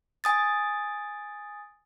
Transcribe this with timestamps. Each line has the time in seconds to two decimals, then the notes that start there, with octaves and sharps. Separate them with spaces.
0.24 G#5 D#6 A6